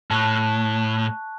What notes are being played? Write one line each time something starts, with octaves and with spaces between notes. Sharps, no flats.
A2 A5 C#6 F#6